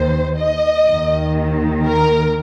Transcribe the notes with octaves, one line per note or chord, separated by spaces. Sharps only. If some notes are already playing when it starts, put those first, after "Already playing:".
Already playing: D#2 D#3 C5
D#5
D#2 D#3
A#4